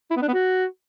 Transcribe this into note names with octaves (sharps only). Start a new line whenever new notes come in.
E4
B3
D4
B3
F#4